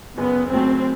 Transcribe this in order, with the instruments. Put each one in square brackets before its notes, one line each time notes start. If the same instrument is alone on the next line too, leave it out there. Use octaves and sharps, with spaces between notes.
[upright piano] F#1 [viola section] B3
[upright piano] F#2 F#3 A3 [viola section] C4